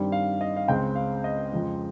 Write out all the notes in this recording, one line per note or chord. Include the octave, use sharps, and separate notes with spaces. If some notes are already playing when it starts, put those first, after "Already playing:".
Already playing: G2 D#3 G3 C4
F5
D#5
F5
C#2 C#3 G#3 C4 G5
F5
D#5
F2 C#3 F3 G#3 C4